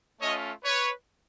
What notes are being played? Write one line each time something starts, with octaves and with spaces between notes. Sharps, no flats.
A3 C#4 F4 C#5 D#5
B4 C#5